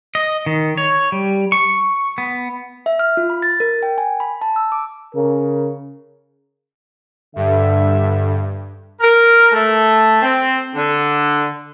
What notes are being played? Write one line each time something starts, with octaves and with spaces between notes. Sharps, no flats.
D#5
D#3
C#5
G3
C#6
B3
E5
F6
F4
B5
A6
A#4
G5
G#5
B5
A5
E6
D6
C#3 A#4
G2 D3 E5
A#4
A3
C4
D3